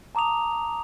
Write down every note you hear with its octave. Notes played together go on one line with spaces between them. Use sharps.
A5 A#5 D6 D#6 F7